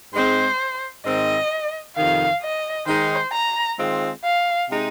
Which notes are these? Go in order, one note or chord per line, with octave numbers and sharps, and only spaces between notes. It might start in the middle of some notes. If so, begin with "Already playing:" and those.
G#2 G#3 C4 C5
G#2 D#3 C4 D#5
F2 C3 D#3 F5
D#5
D#3 G#3 D#4 C5
A#5
D#3 G#3 C4 F4
F5
C3 G#3 D#4